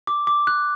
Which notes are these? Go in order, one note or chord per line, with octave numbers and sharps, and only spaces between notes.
D6
D6
F#6